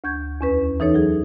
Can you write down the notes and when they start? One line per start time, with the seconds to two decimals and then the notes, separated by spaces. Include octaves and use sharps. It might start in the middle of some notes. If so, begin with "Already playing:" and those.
0.04 D2 C#6 G6 G#6
0.41 E2 C#4 B4
0.80 E3 D#4 A4 C#5
0.94 F#3 G#4